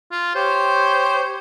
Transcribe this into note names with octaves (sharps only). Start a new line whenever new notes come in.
F4
G4 C5 C#5